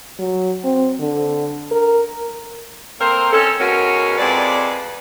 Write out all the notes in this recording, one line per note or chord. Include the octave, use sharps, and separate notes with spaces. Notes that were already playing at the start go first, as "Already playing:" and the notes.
F#3
C4
D3
A#4
A#3 C4 A4 A#4 C5
C4 C#4 D#4 A4
B2 G#3 B3 C#4 F#4 A#4
F2 G#3 B4 D5